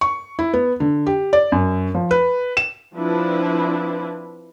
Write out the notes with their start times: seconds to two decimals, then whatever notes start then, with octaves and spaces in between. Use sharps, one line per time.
0.01 C#6
0.39 E4
0.54 B3
0.80 D3
1.07 G4
1.33 D5
1.52 F#2
1.95 F3
2.11 B4
2.57 E7
2.95 F3 C4 D4 E4 B4